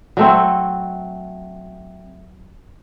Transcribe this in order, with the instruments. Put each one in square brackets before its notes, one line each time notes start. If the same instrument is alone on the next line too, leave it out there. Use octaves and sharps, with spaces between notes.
[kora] F#3 A3 C4